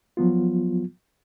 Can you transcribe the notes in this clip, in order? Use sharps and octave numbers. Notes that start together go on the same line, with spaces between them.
F3 F#3 B3 F4